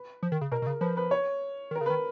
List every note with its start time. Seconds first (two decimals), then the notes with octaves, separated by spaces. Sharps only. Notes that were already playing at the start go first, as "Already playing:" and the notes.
Already playing: B4
0.23 F3
0.32 D#3
0.41 C#3
0.52 B2 A#4
0.62 B2
0.67 C#3
0.81 F3 B4
0.97 B4
1.11 C#5
1.71 D#3 A#4
1.81 C#3
1.86 D#3 B4